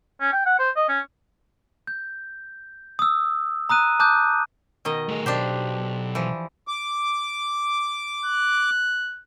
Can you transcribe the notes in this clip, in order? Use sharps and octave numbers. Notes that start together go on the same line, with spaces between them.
C#4
G5
F#5
C5
D#5
C#4
G6
D#6 E6
A#5 D#6 F#6 D#7
A5 D6 D#6 F#6 G6
B2 D#3 D#5
A3 G#4
B1 D4 G4 C5
E3 F3
D6
F#6